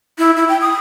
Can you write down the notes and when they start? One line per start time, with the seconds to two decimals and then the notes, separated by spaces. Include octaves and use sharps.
0.18 E4
0.37 E4
0.49 G5
0.61 D#6